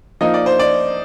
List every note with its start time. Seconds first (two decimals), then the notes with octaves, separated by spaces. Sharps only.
0.21 F3 A#3 D#4 D#5
0.34 D5
0.46 C5
0.59 D5